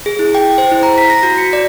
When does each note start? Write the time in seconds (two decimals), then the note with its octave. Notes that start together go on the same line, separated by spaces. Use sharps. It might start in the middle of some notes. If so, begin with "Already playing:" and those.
0.06 G#4
0.19 E4
0.35 G5
0.58 C5
0.71 E4
0.83 A#5
0.98 B6
1.10 A#6
1.23 F#4
1.38 C#7
1.53 D5